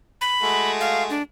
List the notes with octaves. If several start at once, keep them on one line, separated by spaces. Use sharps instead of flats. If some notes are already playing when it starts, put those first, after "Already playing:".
B5
G#3 A3 F#4
F5
D4